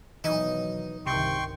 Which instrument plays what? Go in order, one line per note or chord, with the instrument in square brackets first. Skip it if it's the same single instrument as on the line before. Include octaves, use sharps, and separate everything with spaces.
[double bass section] B2 D#3 F#3 [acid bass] E3 [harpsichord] D#4
[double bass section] C2 G2 D#3 [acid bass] C3 [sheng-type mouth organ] G5 C6 C#6